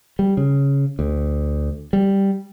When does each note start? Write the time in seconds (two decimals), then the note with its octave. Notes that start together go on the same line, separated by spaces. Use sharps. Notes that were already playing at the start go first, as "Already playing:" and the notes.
0.19 G3
0.37 C#3
0.99 D2
1.93 G3